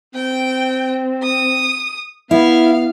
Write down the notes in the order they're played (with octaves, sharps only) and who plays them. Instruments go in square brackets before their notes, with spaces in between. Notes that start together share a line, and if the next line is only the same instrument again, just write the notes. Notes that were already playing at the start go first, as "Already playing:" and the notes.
[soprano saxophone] C4 [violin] G5
[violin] D#6
[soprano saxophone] B3 [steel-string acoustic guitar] E4 [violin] F5